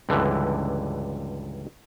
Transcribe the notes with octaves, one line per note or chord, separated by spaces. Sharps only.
C#2 G2 D3 E3